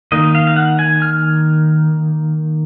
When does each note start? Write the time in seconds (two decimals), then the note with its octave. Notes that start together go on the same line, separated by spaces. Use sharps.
0.12 D#3 A#3 D#4 D#5
0.35 F5
0.47 F5
0.56 F#5
0.79 G#5
1.02 F6